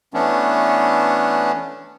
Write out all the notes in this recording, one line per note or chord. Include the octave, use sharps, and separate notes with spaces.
E3 A3 B3 C#4 D4